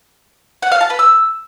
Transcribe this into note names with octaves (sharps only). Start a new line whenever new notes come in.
F#5
F5
A5
B4
E6